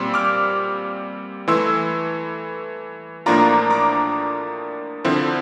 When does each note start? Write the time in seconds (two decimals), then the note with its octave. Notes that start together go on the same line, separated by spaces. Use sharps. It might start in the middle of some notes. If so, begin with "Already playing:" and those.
Already playing: A#2 G3 C4 C6 E6
0.14 D6 F6
1.48 E3 A3 E4 C6 E6
3.26 A2 F3 A#3 D4 F4 A#5 D6
3.70 A#5 D6
5.05 D3 F3 C4 E4